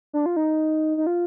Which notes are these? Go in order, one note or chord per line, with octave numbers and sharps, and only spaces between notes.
D4
F4
D#4
D#4
F4